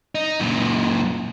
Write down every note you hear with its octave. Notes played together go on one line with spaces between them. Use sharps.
D#4
F#2 A#2